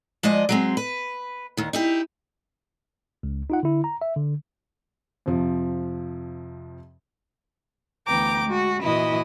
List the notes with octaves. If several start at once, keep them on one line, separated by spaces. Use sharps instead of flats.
F3 G#3 D5 D#5
F#3 G#3 C4
B4
D#2 D#3
D#4 E4 G4
C#2
D#4 F4 F#5
D3 E4
A#5
E5
D3
F2 C3 F3
D2 E3 B3 G5 A#5 D6
G#3 F#4
A#2 E3 E4 F#4 D#5 D#6